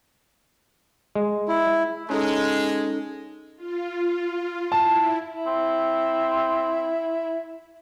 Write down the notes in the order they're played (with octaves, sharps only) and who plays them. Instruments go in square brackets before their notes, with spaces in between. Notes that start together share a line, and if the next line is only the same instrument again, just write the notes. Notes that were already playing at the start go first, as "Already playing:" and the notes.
[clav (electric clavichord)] G#3
[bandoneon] E4
[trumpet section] G#3 [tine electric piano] C#4 D#4 A4
[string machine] F4
[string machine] E4 [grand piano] A5
[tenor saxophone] E4
[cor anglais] C4